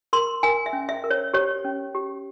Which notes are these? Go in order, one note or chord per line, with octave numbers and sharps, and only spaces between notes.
A#4 C6
A#4 G#5
E5
C#4
E5
A#4
C#5
G4 C#5
C#4
G4